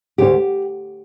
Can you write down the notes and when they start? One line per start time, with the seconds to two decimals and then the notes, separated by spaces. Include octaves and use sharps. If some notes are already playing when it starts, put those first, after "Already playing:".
0.18 D2 G4